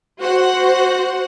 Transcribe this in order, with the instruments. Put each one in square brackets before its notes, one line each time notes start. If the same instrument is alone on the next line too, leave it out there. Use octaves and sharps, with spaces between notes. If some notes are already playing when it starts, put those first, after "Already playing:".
[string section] F#4 C5 F#5